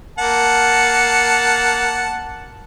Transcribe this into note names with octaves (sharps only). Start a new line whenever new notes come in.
A#3 F#5 A5